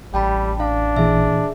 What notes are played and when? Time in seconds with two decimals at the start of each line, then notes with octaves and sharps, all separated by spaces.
0.14 A1 G3 G5 A5 B5
0.60 D4 F5
0.96 A#2 E3 G#4 E5